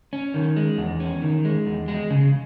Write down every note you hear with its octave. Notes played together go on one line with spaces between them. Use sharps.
C#4
D#3
G#3
E2
C#4
D#3
G#3
E2
G#3
C#3